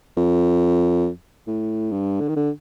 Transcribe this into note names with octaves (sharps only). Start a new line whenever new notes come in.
F2
A2
G2
D3
D#3
D3